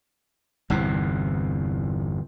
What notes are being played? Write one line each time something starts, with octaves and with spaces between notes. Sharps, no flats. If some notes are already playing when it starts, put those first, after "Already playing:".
G1 E2 C3